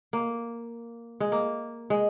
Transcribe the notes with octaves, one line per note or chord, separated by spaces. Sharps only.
A#3
G#3
A#3
G#3